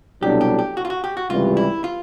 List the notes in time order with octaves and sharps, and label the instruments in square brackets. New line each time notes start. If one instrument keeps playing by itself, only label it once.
[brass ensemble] C2 B2 F#3 A3 D4 [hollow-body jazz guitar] G4
[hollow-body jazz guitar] G4
G4
F#4
F4
F#4
G4
F#4
[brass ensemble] C#2 C3 E3 G3 [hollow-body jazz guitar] F4
[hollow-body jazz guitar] E4
F4